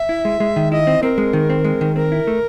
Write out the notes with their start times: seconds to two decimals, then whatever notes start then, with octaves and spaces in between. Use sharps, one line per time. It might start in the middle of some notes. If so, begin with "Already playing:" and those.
Already playing: E5
0.09 E4
0.25 G#3
0.40 G#3
0.56 D#3
0.72 E4 D#5
0.87 C4
1.03 C4 A#4
1.18 G#3
1.33 D#3
1.50 C4
1.64 G#3
1.81 D#3
1.96 C4 A#4
2.12 E4
2.27 A3